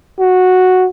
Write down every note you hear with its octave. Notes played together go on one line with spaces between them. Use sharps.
F#4